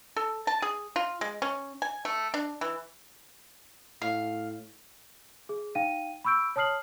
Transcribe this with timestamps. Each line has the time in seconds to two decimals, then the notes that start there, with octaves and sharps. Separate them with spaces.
0.16 A4
0.47 A5
0.62 G#4
0.96 F4
1.21 G#3
1.42 C#4
1.82 G#5
2.05 A3
2.34 D4
2.61 E3
4.02 A2 F5
5.49 G#4
5.75 D#4 F5 G5 D#7
6.24 B5 C#6 E6 G6 D7
6.56 C#5 A5 D#6 F6 C7 F#7